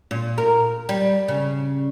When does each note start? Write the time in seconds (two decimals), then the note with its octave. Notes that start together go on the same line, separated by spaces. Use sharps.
0.11 A#2
0.38 A#4
0.89 G3
1.28 C#3